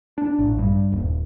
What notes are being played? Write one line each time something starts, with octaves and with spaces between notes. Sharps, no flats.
D4
A1
G2
D#1